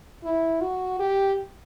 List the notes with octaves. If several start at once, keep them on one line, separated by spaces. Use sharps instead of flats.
E4
F#4
G4